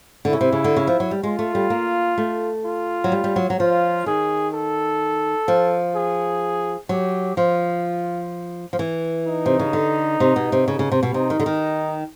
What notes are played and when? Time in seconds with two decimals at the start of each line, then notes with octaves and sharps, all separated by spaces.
0.25 D3
0.29 C#3 E4
0.41 C3
0.53 C#3
0.64 D3
0.76 C#3
0.87 F3
1.00 F#3
1.11 G3
1.23 G#3 F4
1.39 A3
1.55 G3
1.70 A#3
2.18 A3
2.65 F4
3.04 F#3
3.12 G3
3.24 G3
3.36 F#3
3.50 F#3
3.59 F3 F4
4.06 D#3 G#4
4.54 A4
5.48 F3
5.95 G#4
6.89 F#3 G4
7.37 F3 F4
8.73 F3
8.79 E3
9.26 D#4
9.46 C3
9.59 C#3
9.73 D3
10.20 C3
10.36 B2
10.52 C3
10.68 C#3
10.79 C#3
10.92 C3
11.03 B2
11.14 C3 D#4
11.30 D#3
11.40 D3
11.46 D#3